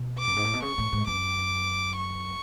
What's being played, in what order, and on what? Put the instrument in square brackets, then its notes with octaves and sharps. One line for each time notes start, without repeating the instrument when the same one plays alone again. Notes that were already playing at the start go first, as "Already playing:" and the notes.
Already playing: [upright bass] B2
[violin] D6
[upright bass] F#2
G#2
A2
B2
[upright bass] C#3 [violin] C#6
[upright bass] A2
G#2
[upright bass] F#2 [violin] D6
[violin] C#6